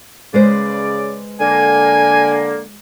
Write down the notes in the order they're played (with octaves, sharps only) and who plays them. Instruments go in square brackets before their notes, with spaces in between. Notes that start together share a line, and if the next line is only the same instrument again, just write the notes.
[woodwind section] C#3 D5 [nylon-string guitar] G#3 B4 C5
[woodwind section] D3 A#3 [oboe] G#5